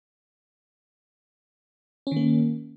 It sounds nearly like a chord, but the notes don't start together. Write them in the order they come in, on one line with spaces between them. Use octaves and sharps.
C#4 D#3 A#3